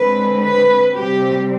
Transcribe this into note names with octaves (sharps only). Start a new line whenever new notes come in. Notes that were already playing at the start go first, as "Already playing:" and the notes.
Already playing: D3 G#3 C4 B4
B4
C3 G3 C4 G4